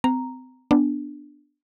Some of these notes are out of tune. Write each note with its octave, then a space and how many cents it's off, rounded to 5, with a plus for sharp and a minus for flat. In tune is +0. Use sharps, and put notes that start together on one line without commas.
C4 -40 A#5 +0
B3 +0 D4 +0